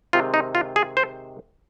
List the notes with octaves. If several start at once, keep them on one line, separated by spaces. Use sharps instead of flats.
C3 D#3 G#3 C4 F4
D#4
F4
G#4
C5